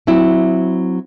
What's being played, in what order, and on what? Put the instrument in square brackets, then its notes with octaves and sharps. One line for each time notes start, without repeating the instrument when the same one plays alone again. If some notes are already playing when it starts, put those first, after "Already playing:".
[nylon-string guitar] F#3 C4 E4